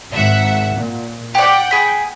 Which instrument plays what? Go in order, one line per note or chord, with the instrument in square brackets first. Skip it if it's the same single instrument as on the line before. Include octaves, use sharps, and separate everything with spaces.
[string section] G#1 E5 F#5
A#2
[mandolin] G4 D5 [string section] F#5 G5
[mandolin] G#4 B5